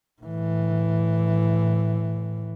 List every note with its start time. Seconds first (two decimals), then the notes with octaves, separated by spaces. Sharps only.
0.21 A2 E3